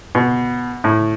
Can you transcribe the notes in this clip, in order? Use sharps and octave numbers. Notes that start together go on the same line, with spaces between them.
B2
A2